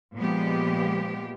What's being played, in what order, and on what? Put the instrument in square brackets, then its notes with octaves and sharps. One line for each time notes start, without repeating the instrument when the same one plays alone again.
[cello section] A#2 F3 G#3 B3 G4